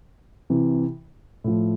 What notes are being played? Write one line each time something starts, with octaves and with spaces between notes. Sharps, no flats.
C3 E3
A2 F3